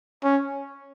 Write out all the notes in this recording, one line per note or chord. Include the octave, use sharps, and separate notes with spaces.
C#4